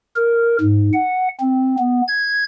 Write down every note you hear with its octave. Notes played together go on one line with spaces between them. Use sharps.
A#4
G#2
F#5
C4
B3
G#6